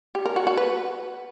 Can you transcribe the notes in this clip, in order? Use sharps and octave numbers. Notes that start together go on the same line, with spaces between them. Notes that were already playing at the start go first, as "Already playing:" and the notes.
G4
A#4
F#4
F#4
B4